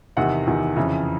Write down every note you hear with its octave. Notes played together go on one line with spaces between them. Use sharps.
E2 C3 D#3 F#5
E2 C3 D#3
F2 C#3 E3